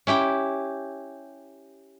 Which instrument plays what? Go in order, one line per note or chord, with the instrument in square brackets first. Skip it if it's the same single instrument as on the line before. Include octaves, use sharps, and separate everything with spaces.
[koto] C#4 E4 G4 G5